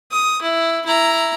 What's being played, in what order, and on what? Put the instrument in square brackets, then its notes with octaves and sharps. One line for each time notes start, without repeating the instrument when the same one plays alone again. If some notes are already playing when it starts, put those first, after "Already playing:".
[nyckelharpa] D#6
E4
E4 A#5